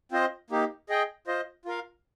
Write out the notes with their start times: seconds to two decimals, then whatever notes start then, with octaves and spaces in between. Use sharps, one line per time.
0.12 C4 F4 C5 D#5
0.50 A#3 D#4 G4
0.89 G#4 D#5 G5
1.27 F4 C5 D#5
1.65 F4 A#4 F5